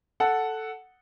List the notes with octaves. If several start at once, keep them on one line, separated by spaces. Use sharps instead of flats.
A4 F#5